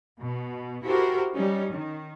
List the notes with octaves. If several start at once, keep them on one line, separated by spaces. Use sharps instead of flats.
B2
E4 F#4 G4 A4 A#4 C5
G3 C#4 D#4
D#3